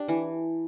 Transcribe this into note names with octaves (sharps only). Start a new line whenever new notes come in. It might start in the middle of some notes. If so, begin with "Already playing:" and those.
Already playing: D4 G4
E3